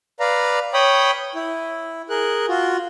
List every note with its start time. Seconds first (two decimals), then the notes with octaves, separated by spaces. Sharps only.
0.20 B4 D5 F5 A#5
0.74 C#5 G5 B5 D#6
1.35 E4
2.09 G#4 A#4 F#6
2.48 F4 F#4